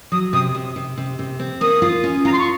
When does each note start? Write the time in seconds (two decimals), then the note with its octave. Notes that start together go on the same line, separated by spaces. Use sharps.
0.12 F#3 D#6
0.33 C3 D#6
0.55 C3
0.76 C3
0.98 C3
1.19 C3
1.39 C4
1.61 A#3 D#6
1.82 F4
2.04 C#4
2.25 F4 A#5
2.32 C6
2.39 C#6